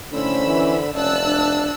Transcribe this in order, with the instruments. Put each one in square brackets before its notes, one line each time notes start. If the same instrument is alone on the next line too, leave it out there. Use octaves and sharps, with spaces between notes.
[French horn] A2 [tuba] D3 [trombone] C#4 [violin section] C5 B5 E6
[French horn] E3
[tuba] F1 [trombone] C#4 [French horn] D5 [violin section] A5 E6 F#6
[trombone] D4